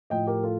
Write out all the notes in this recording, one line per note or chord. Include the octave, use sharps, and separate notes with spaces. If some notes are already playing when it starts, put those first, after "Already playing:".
A2 F3 D#5 G5
G4 A#4
F4 A4